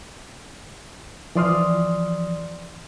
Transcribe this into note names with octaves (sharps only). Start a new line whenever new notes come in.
E3 F3 D5 C6 D#6 F6